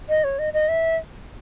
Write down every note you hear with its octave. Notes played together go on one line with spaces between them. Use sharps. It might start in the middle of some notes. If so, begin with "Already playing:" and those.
D#5
C#5
D#5
D#5
E5